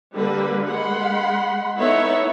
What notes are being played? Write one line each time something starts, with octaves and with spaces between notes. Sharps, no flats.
D3 G3 A#3 B4
G#3 F#5 B5 C6
B3 D#4 E4 A4 C#5 E5